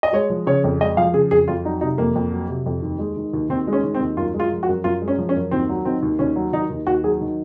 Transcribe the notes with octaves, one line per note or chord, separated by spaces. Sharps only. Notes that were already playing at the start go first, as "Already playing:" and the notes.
D#5
G#3 C#5
F3
C#3 C#5
F2
G#3 D#5
F3 F5
C#3 G#4
F2 G#4
F2 F4
F#3 D#4
C3 D#4
F2 A#3
F2
F#3
C3
F2
D#2
G#3
D#3
D#2
D#2 C4
G#3
C#4
D#3
C4
D#2
F#2 F4
G#3
F4
F3
F#4
F#2
F#2 F4
G#3
C#4
F3
C#4
F#2
D#2 C4
F#3
D#3 C4
D#2
D#2 C#4
F#3
D#3 D#4
D#2
D#2 F#4
F#3 G#4
D#3